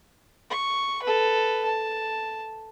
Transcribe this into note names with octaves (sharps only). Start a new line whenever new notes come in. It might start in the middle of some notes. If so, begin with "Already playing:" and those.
C#6
A4 B4
A5